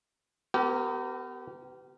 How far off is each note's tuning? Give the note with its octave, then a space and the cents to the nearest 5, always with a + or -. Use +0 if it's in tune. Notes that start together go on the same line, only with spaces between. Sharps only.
B3 +30 G4 -30 A#4 -15